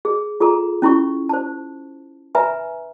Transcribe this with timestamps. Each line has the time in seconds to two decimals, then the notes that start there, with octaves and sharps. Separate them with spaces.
0.05 G#4
0.40 F4 G#4 A4 A#5
0.82 C#4 E4 B5 C#6
1.29 C5 A5
2.35 B4 E5 G#5 A#5 B5